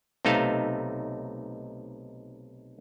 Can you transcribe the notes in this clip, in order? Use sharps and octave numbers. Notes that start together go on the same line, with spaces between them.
B1 C3 A3 D#4 F5 A5